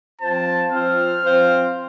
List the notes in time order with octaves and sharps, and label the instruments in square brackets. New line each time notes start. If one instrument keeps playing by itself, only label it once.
[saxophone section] F3 C4 F4 C5 [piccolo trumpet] A5
[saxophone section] F3 C4 F4 C5 [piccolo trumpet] F6
[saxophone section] F3 C4 F4 C5